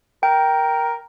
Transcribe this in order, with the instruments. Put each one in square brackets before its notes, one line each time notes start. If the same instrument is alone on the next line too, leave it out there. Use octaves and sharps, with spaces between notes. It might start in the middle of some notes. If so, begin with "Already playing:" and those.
[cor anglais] A#4 [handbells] G5